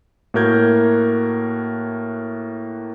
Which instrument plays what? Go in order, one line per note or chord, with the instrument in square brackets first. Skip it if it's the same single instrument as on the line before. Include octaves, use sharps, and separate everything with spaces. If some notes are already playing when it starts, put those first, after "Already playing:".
[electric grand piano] A2 A#3 F#4 A#4 G6 G#6